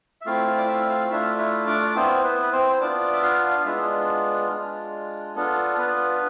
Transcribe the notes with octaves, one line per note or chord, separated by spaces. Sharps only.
E5
A3 C4 E4 F4 F5
F4 F5
D5
E4 E5
F4 F5
A3 D4 E4 F4 E5
E4 E5
D4 D5
D5
B3 C4 E4 C5
B3 B4
B4
C4 C5
C5
B3 D4 F4 D5
E5
F4 F5
F5
G#3 B3 D4 E4 F4 E5
G#3 D4 F4
B3 D4 F4 A4
B3 B4